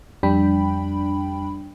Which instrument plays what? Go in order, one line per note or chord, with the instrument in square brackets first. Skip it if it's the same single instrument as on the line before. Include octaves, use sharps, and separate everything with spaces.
[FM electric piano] F2 G3 D4 G5 B5